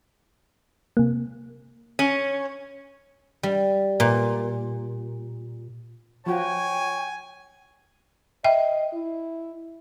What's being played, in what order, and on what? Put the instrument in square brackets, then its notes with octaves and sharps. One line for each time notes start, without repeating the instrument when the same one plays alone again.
[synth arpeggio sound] C3 A#3
[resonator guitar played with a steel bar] C#4 [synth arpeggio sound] D#7
[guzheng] G3
A#2
[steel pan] F3 F#4 [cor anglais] C#5 [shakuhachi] G5 [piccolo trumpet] G#5
[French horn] D#5 [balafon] E5 G5
[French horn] E4